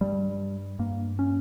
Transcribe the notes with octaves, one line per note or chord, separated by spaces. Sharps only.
G2 G3
G2 A#3
C#4